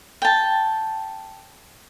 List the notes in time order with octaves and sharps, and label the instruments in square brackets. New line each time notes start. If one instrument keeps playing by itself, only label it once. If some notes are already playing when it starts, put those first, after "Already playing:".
[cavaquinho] G5 A5